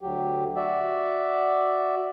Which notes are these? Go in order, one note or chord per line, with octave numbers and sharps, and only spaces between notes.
D2 F#3 G4
F#4 D5 E5